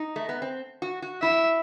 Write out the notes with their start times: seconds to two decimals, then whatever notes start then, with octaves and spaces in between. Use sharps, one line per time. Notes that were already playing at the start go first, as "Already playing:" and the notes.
Already playing: D#4
0.16 A3
0.29 B3
0.42 C4
0.82 F#4
1.02 F#4
1.22 E4 E5